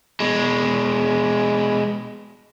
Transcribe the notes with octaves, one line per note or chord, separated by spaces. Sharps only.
B2 G#3